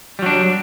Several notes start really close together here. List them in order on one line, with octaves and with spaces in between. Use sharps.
G3 F#3 D4